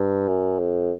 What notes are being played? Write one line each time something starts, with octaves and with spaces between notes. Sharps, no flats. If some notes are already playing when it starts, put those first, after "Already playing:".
Already playing: G2
F#2
F2